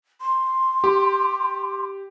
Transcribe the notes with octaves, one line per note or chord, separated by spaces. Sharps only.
C6
G4